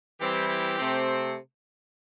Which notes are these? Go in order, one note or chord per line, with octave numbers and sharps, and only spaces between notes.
E3 G3 C4 E4 G4
G4
C3 A3 C4